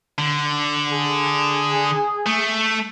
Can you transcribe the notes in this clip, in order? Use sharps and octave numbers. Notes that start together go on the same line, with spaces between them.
D3
G#4
A3